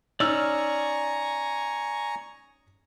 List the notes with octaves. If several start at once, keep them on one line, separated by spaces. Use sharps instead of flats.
C#4 D#4 D5 G#5 A#5 C#6 E6 F6